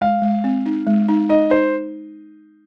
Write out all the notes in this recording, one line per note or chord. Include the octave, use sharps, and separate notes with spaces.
G#3 F5
G#3
C4
D#4
G#3
D#4
D#4 D#5
D#4 C5